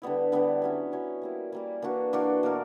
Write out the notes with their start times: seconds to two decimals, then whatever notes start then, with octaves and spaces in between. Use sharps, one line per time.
0.02 D3 G3 B3 E4
0.32 D3 G3 B3 E4
0.62 F#3 C#4 E4
0.92 F#3 C#4 E4
1.22 G3 A#3 E4
1.52 G3 A#3 E4
1.82 E3 A#3 D4 F#4
2.13 E3 A#3 D4 F#4
2.43 B2 A#3 D4 A#4